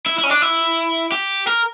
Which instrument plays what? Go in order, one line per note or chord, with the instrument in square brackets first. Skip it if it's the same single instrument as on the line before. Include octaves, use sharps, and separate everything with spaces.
[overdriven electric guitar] E4
E4
C#4
D4
E4
G4
A#4